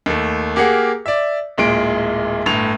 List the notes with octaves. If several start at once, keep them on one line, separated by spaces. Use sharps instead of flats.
D#2 A3
A#3 G4 G#4 A#4 F#5
D5 E5
D1 A#2 G#3 D7
G1 A2 F7